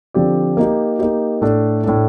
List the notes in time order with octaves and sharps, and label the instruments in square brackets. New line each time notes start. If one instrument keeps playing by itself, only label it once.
[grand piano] D3 F3 C4 G4 D5
A#3 D#4 G4
A#3 D#4 G4
A2 A3 D4
A2 A3 D4